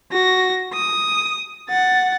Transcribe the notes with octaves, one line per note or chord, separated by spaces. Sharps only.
F#4 A#6
D#6
F#5 A6